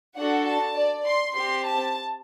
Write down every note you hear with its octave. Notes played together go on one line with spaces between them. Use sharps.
D4 F#4 A4 F#5
A5
D5
C6
C4 G4 C6
A5